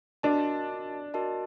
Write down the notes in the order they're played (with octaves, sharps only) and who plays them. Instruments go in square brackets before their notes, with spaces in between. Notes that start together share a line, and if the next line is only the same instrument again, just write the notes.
[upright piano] D4 [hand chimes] F#4 A#4 D#5 A5
[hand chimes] F#4 A#4 D#5 A5